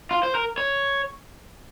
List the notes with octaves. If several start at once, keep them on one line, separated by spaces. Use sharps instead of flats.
F4
C5
A#4
C#5